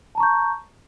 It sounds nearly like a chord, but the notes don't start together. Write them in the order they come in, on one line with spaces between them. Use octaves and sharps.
A5 A#5 C#6 G6